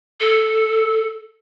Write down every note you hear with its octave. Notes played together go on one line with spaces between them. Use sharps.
A4